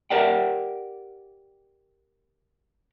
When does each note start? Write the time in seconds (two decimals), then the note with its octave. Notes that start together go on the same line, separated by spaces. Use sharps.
0.10 G4 A#4 D5 F#5 G5